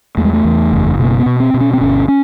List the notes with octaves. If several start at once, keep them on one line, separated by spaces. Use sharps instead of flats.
E2 A3
G#3
A3
E2
F#1
B2 A#3
B3
B2
C4
B2
C#4
C4
G1 C#4
C#4